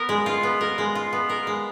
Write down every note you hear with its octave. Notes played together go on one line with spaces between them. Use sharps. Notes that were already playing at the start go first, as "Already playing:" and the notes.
Already playing: B3 A#4
G#3
F4
B3
A#4
G#3
F4
B3
A#4
G#3